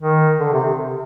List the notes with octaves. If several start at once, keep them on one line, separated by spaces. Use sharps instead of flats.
D#3
D3
C3